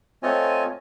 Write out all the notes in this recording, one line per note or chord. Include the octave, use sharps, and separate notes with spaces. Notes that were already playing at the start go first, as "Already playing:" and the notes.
A3 C4 F4 C#5 D#5 G#5